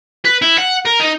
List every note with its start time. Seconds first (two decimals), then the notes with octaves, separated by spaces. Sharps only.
0.25 B4
0.42 E4
0.58 F#5
0.85 A#4
1.00 D#4